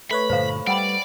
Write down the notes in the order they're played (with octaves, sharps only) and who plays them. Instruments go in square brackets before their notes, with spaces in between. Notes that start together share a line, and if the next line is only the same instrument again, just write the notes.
[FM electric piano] A3 B4 C#5 [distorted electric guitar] B5
[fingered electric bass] G2 A#2 D3 [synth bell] C5 F5
[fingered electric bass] G3 [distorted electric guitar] D5 [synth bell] F#5 G5 B5